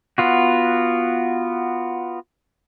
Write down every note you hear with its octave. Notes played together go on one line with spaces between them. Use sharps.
B3 F4 F#4